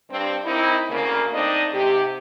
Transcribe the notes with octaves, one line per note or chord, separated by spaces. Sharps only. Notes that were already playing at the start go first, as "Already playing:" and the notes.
G2 C4
A#3 C4 D#4 E4
D2 C#3 A#3
A3 C4 D4 D#4 D#5
G#2 C3 G4